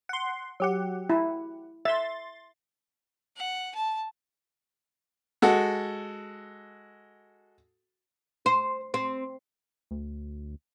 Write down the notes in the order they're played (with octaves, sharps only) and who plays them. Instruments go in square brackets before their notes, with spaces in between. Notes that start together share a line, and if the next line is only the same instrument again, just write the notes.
[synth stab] F#5 C6
F#3 G4 F#5
[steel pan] E4
[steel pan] E5 [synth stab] C6 A6
[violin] F#5
A5
[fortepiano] G#3 F#4 A4
[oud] C5
C4
[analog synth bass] D2